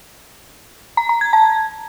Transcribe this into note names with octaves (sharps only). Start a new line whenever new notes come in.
A#5
A#5
G#6
A5